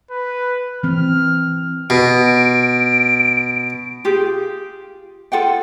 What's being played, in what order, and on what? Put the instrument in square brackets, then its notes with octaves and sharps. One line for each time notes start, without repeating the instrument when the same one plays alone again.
[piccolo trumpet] B4
[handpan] E3 C4 [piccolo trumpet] F6
[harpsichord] B2 [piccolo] D7
[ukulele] F4 G4 G#4
F4 A4 F#5 G5